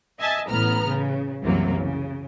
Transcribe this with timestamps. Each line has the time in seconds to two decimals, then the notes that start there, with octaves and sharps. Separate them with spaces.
0.19 D#5 E5 G#5 A5
0.49 A1 A2 B3 A#5 F6
0.85 C#3
1.42 C2 F#2 C3 E3 F#3 A#3
1.80 C#3